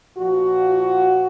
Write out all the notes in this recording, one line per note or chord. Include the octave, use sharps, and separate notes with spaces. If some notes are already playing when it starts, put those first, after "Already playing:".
A#2 F3 F#4